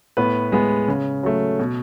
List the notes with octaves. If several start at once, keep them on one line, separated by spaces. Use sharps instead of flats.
A2 B3 B4
G#3 B3
C#3
F#3 A3
B2